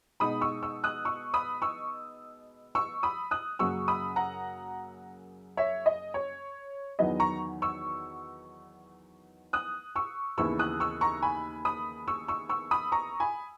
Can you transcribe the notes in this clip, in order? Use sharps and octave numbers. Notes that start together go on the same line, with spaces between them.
B2 G#3 D#4 B5 D#6
C#6 E6
C#6 E6
D#6 F#6
C#6 E6
B5 D#6
C#6 E6
C#6 E6
B5 D#6
D#6 F#6
F#2 C#3 F#3 A#3 C#6 E6
B5 D#6
F#5 A#5
C#5 E5
D#5
C#5
E2 D#3 F#3 B3 D#5
A#5 C#6
C#6 E6
D#6 F#6
C#6 E6
D#2 C#3 E3 B3 E4 C#6 E6
D#6 F#6
C#6 E6
A#5 C#6
G#5 B5
B5 D#6
C#6 E6
C#6 E6
C#6 E6
B5 D#6
A#5 C#6
G#5 B5